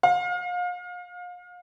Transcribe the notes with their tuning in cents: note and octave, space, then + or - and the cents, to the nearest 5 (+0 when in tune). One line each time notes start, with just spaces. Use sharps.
F5 +35